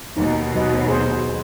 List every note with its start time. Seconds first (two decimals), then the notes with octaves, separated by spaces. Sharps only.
0.17 D#2 B2 D#4
0.55 F#3 B4 D#5
0.88 G#4 C5